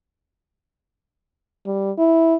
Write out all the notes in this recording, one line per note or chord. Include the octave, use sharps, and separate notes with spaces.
G3
E4